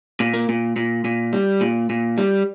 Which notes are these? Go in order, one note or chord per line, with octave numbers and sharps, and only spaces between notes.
A#2
A#3
A#2
A#2
A#2
G3
A#2
A#2
G3